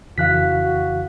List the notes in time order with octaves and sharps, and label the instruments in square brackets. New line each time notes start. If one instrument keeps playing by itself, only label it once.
[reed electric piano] F2 C#3 E3 [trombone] F#4 [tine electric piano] F5 F#6 B6